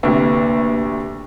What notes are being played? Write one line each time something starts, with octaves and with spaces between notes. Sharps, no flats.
D2 C3 A#3 B4